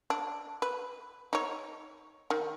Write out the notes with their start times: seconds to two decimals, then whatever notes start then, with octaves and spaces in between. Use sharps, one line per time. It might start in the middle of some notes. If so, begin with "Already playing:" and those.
0.10 D4
0.62 B4
1.33 D#4 C#5
2.30 D#3